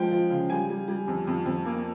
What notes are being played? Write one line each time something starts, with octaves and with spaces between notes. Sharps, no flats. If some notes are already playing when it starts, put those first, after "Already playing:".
Already playing: F3 G#3 G5
F3
C#3
G3 G#5
G3
G3
F2
F2
F2
A#3